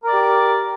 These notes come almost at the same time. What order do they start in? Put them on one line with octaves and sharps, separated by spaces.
A#4 D5 G4